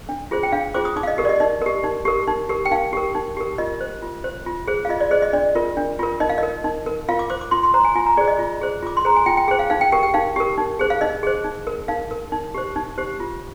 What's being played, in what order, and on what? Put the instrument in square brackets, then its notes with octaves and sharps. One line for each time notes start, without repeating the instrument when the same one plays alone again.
[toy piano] D4
F4 G#4 C5
G5
D4 F5
F4 G#4 C5 D6
D#6
D#4 D6
F5
D#5
G4 A#4
D5
D#5
D#4 D#5
G4 A#4
D#4
G4 A#4
D#4
G4 A#4
G5
D#4 F5
G4 A#4
D#4
G4 A#4
F4 D#5
C5
F4
C5
F4
G#4 C5
F5
F4 D#5
D5
G#4 C5 D#5
D#5
D4 D5
F4 A#4
D4
F4 A#4
D#4 D#5
F5
A#4 D#5
D#4
A#4
F4 F5
D6
C5 D6
D6
F4 C6
C6
C5 A#5
G#5
F4 G#5
A#5
G#4 C5 D5
D#5
F4
G#4 C5
F4 D6
C6
G#4 C5 A#5
G#5
F4 G5
G5
G#4 C5 G5
F5
D#4 F5
G5
G4 A#4 G5
G5
D#4 F5
G4 A#4
D#4
G#4 C5
F5
D#4 D#5
G#4 C5
D#4
A#4
D#4 F5
A#4
D#4
G4 C5
D#4
G4 C5
F4